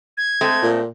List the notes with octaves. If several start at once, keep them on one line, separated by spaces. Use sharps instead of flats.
G#6
G#3 A3 C4
A#2